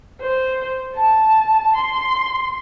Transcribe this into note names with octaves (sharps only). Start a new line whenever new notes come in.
C5
A5
C6